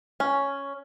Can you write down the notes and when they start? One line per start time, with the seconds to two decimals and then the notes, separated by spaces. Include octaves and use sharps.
0.20 C#4